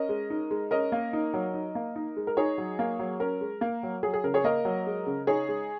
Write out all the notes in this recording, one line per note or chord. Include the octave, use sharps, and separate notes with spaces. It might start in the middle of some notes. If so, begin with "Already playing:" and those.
Already playing: C#4 A#4 D#5
G#3
D#4
G#3
C#4 A#4 D#5
A#3
D#4
F#3
D#4
A#3
D#4
G#3
A#4
D#4 G#4 C#5
F#3
A#3
F#3
C#4 A#4
G#3
A#3
F#3
F#3 G#4
G#4
C#3 A#4
G#4 C#5
A#3 A#4 D#5
F#3
G#3
C#3
D#4 G#4 C#5
G#3